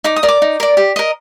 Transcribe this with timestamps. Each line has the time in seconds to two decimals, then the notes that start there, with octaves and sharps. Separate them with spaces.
0.04 D#4 D6
0.16 D#6
0.23 A#4 D5
0.28 D6
0.42 D#4
0.60 A#4 D5
0.77 G4
0.96 A#4 D#5